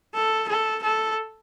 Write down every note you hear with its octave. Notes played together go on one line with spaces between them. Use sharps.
A4
A4
A4